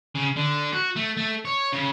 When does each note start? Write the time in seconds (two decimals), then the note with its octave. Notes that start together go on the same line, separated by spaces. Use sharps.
0.15 C#3
0.36 D3
0.73 F#4
0.96 A3
1.17 A3
1.45 C#5
1.72 C#3